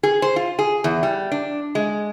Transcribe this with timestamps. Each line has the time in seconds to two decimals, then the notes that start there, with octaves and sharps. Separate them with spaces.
0.03 G#4
0.22 C5
0.36 F4
0.59 G#4
0.84 E2
1.03 G3
1.32 D4
1.75 G#3